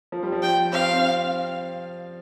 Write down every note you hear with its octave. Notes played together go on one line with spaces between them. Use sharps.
F3
G3
F3
G5
C4 F5
C4